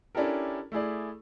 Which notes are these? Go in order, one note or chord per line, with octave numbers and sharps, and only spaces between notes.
C#4 D4 E4 G4 A4 A#4
A3 E4 G#4 D5